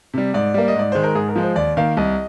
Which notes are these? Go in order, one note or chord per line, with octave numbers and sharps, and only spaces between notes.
C3 G3
G#2 D5
G3 A#3
D#5
G#2 D5
D#3 G#3 C5
A#4
G#2 G#4
A#4
F3 G#3
C5
D#2 D5
D#3 A#3 F5
C2 D#5